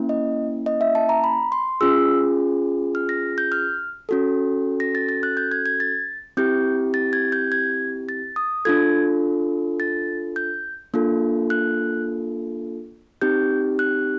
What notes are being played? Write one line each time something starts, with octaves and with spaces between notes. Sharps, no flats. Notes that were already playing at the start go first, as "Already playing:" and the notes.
Already playing: A#3 C#4 E4
D#5
D#5
E5
A5
A#5
B5
C6
C#4 F4 G#4 E6
F6
A#6
G6
F6
C#4 F#4 A4
A#6
A6
A6
F#6
G6
G#6
G#6
A6
C4 E4 G4 G6
A6
G#6
G6
G#6
A6
D#6
D4 F4 A4 G#6
A6
G6
A#3 D4 F4 A4
F#6
C4 D#4 G4 G6
F#6